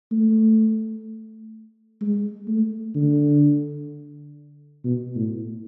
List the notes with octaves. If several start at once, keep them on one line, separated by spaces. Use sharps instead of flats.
A3
G#3
A3
D3
B2
A2